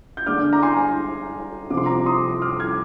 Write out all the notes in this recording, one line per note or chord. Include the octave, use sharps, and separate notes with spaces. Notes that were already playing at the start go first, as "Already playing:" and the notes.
G6
D3 G#3 D4 D6 F6
A#5
G#5 C6
C3 F3 C4 D6
C6
A#5 D6
C6 D#6
D6 F6
F6 G#6